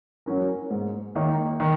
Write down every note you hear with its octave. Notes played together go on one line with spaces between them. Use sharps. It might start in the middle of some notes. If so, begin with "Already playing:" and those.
F#3 C#4 A#4
G#2
D#3 A#3 D#4
D#3